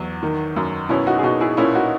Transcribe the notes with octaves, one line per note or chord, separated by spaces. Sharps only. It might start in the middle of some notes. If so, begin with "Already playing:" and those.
Already playing: E2 F#3
D#3
F#2
B2 C#4 E4
D#4 F#4
G#4
B2 D#4 F#4
E4 G#4
A#2 C#4 E4
D#4 F#4